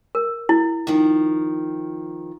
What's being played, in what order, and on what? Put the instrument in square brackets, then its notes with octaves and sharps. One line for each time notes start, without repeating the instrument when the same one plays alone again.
[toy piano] A#4
E4
[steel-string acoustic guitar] D#3 F3